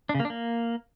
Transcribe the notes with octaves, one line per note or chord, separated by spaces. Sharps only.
D4
C#3
A#3
D4
A#3